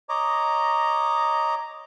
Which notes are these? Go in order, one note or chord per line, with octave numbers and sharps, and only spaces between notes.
C#5 D#5 A#5 D6